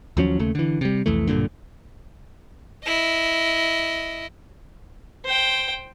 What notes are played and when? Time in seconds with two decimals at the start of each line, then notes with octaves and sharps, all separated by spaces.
0.17 D#2 F3 F#3 C#4
0.39 D#2 C#3 A3
0.55 D3 E3
0.81 C3 G3
1.06 C2 F2 E3 A3
1.28 B1 G2 A#2 D3
2.85 E4 D#5
5.25 C5 G5